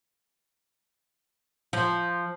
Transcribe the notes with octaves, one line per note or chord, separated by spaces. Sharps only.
F3